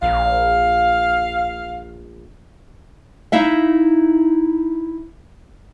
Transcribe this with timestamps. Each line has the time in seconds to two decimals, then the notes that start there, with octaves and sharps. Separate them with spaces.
0.03 A#1 F5
3.32 D#4 E4 E5 F5